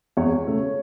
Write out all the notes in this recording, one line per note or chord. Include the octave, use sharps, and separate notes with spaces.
E2 C#5
C#3 A3